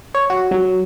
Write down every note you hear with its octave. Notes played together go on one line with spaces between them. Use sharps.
C#5
F#4
F#3